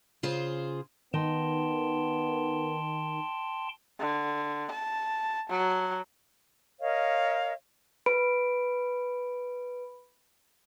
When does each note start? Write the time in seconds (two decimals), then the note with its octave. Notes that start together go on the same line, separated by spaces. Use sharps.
0.23 C#3 F4 G#4 C5
1.14 D#3 B3 D#4 G5 A5 C6
4.00 D3
4.71 A5
5.50 F#3
6.80 A#4 C#5 D#5 F5
8.06 B4 B5 D7